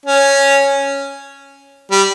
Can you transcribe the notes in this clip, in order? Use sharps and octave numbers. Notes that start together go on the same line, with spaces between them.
C#4
G3